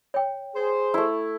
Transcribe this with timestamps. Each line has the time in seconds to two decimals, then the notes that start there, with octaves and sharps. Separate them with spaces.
0.14 C#5 G5
0.55 G#4 C5
0.94 A3 E4